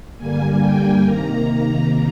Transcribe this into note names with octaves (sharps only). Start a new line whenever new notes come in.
G2 D3 G3 A#3 G#5
G5
C3 D#3 A#3 A#5
A#5